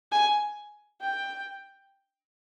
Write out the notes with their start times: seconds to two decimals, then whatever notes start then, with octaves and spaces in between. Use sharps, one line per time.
0.12 G#5
1.01 G5